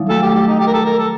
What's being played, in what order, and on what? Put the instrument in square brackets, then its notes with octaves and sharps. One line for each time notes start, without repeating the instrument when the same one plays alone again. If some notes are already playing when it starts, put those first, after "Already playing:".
Already playing: [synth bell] D#3 F#3 G3
[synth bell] A3 [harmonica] A4
[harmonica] G4
G4
D#4
G4
A#4
A4
A#4
A4